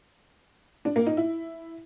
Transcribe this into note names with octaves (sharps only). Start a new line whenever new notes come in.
D4
A#3
D#4
E4